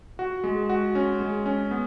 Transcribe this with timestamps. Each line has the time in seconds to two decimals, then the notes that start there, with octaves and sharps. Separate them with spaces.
0.19 F#4
0.44 G#3
0.69 F#4
0.95 C#4
1.20 G#3
1.46 C#4
1.71 B3